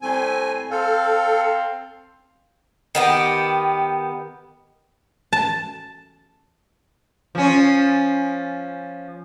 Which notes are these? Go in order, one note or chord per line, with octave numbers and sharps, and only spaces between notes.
A2 G3 C4 G#5
C4 A4 F5
D#3 B3 G4
A5
F3 C#4